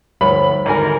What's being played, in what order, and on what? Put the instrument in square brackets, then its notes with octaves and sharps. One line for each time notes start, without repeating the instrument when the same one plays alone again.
[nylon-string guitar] D2 G2 C#5 [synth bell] F3 G3 C5 [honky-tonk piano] B5
[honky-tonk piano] G#1 [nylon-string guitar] D#2 D3 G#5 [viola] A#4